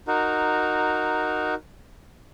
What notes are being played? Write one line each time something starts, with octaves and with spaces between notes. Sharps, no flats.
D#4 F#4 A#4